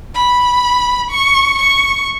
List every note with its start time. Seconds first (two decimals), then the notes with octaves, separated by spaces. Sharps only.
0.14 B5
1.11 C#6
1.59 C#6